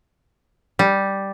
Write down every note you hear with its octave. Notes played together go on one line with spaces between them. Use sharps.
G3